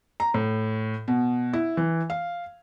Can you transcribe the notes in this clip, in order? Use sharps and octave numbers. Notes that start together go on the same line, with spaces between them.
A#5
A2
B2
E4
E3
F5